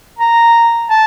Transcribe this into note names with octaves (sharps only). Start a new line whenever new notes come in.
A#5
A5